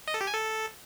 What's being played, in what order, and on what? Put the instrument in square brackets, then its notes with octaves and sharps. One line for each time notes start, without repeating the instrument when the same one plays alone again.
[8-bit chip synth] D#5
A4
G4
G#5
A4